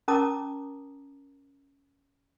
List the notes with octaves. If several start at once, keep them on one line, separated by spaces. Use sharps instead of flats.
C#4 A#4 A5 A#5 D6 D#6